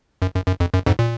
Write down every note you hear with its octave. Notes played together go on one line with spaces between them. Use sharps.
F#2
F#2
F#2
F2
F#2
F2 G#2
A#2